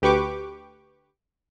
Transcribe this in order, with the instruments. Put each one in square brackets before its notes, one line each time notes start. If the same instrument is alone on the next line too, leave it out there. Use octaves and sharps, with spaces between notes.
[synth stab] D2 G4 B4 C#6 D6